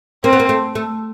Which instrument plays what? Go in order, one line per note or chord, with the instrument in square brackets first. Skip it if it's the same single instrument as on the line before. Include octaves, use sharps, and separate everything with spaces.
[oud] A#3 [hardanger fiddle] C4
[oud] B3
A#3
A3
A3